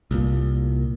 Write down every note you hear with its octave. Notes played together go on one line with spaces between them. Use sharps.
C2 A#2